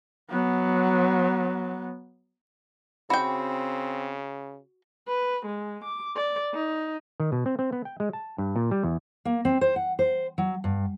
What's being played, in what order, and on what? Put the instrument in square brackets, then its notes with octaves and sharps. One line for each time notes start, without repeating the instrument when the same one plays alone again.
[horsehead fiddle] F#3 B3
[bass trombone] C#3 [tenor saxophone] C4 [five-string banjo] F#4 G5 [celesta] B5
[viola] B4
G#3
D6
D5
D#4
[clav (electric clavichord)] D#3
B2
C4
C4
B3
G5
G#3
A5
G2
A#2
G3
E2
[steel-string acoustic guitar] A#3
C4
C5
F#5
C5
F#3
G2